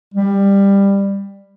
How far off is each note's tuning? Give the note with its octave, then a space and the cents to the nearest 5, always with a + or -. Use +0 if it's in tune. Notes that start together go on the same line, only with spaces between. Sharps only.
G3 +15